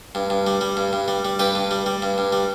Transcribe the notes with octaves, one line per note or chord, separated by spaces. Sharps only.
G2
G2
G3
G3
G2
G2
G3
G3
G2 G4 B4
G2
G3
G3
G2
G2
G3